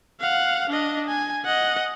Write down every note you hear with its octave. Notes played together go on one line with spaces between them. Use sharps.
F5 F#5
D4 D#5
G#5
D#5 F#5